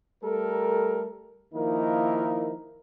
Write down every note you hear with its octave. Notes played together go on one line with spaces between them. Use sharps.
G3 A3 A4 A#4
D#3 F3 A#3 D#4 E4 A#4